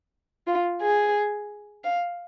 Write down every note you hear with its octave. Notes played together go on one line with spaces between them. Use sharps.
F4
G#4
F5